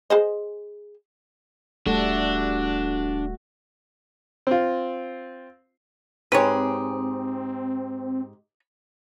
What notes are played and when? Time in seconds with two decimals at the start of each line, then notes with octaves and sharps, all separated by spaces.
0.10 G#4 C5 D#5
1.87 D1 G3 A3 D4 F#4 A4
4.47 C4 F4
6.32 G#2 C4 G4 G#4 B4 C#5